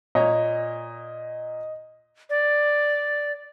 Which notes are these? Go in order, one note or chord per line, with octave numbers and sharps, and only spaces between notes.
A#2 C#5 D#5 A#5
D5